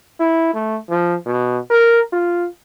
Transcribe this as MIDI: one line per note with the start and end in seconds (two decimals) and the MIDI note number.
0.20 0.53 64
0.54 0.77 57
0.90 1.15 53
1.26 1.58 47
1.70 2.00 70
2.13 2.48 65